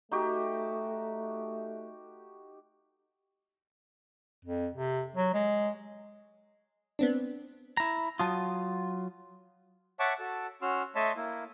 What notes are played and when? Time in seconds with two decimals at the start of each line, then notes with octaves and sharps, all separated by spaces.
0.11 A3 D#4 F#4 G4
4.45 F2
4.75 C3
5.16 F#3
5.34 G#3
6.99 B3 C4 D4
7.77 E4 A#5
8.20 F#3 F4 A5 D#6
10.00 C#5 E5 F#5 A5 C#6 D6
10.20 F#4 A4 A5
10.62 C#4 F#4 C6 E6 F6
10.95 A3 C#5 D#5 E5 A5 C6
11.16 A#3 E4